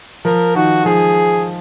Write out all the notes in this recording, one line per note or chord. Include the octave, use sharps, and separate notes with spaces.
F3 A#4
D#3 F#4
F3 G#4